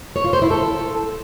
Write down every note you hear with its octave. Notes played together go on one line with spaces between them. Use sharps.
C#5
F4
C5
E4
A4